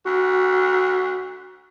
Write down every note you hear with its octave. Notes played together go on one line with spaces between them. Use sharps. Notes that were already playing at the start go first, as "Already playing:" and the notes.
D2 F#4